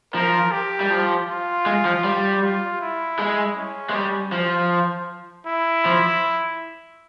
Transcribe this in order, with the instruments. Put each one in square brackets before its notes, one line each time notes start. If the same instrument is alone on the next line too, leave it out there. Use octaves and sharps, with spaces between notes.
[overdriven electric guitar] F3 [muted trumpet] A#4
[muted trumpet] G4
[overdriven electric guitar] G3
F3
[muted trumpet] F4
[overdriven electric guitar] G#3
F3
G3
[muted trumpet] F4
E4
[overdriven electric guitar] G#3
[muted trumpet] C#4
[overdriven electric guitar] G#3
G3
F3
[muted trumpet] E4
[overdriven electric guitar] F3